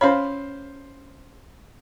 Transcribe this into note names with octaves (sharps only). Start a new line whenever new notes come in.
C#4 C5 C#5 F5 B5